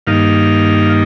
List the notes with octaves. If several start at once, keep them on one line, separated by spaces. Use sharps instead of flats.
G2 D#3 A#3 D#4 F5